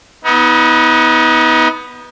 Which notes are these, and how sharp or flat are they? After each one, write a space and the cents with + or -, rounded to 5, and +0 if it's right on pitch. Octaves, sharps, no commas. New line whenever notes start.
B3 +0 D#4 +40